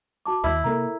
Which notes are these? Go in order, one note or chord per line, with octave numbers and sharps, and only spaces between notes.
F#4 A5 D6
D#2 E4
C3 A#3 A4 A#4 A#5